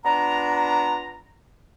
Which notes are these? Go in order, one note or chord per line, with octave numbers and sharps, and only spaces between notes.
B3 D4 F4 A#5